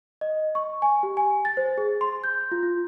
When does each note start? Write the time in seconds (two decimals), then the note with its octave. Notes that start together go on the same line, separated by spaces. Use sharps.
0.21 D#5
0.55 C#6
0.82 G#5
1.03 G4
1.17 G#5
1.45 A6
1.57 C5
1.78 G#4
2.01 C6
2.24 G6
2.52 F4
2.63 F4